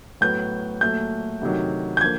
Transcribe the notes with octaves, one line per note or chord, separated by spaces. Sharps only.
A2 F#3 B3 G6
A#2 F#3 A3 G6
D2 C3 D#3 F#3
G6
D3 F3 A#3 G#6